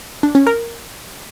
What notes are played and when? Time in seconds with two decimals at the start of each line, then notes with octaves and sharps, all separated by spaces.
0.23 D4
0.35 C#4
0.47 A#4